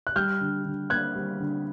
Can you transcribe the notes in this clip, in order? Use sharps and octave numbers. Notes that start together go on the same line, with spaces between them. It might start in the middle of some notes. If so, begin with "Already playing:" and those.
F#6
G3 F6 G6
D3
D3
A#3 F#6 G#6
G3
D3